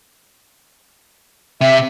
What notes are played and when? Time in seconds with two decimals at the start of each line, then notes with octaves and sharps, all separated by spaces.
1.61 C3 E5